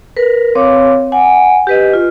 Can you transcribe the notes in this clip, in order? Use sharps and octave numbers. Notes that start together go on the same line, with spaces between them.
A#4 B4
C4 C#5 F5 D6
F#5 G#5
G4 B4 D#5
F4